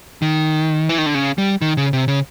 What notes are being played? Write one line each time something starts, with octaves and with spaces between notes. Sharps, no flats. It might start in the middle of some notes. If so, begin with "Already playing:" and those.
D#3
E3
D#3
D3
C#3
G3
D#3
C#3
C3
C#3